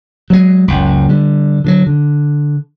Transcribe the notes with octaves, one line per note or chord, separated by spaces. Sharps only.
F#3 G#3
F#1 C#2
D3 G3
D3 D#3 F#3
D3